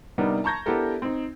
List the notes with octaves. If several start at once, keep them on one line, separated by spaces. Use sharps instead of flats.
C3 G3 B3 D4 D#4 A#4
A5 A#5 C#6 G6 G#6 A#6
B3 D4 E4 G4 A4 A#4
C4 D#4